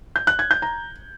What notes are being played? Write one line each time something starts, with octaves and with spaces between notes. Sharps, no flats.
G6
F#6
G#6
G6
A#5